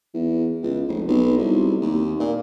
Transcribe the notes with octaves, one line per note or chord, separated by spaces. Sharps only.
E2
C#2
F1
B1
C2
D#2
A#2